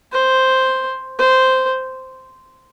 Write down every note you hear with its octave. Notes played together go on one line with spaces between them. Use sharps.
C5
C5